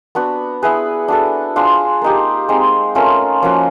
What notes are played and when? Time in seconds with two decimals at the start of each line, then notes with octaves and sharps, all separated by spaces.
0.15 B3 D4 F#4 B4
0.62 B3 E4 G#4 B4
1.08 D4 F#4 A4
1.56 D4 F4 G#4 C5
2.02 A#3 D#4 G4
2.49 G#3 C4 D#4
2.95 A3 C#4 F4 A#4
3.43 F3 A#3 C#4 F#4